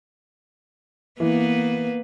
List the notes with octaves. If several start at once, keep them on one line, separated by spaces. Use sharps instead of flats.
E3 A#3 B3 B4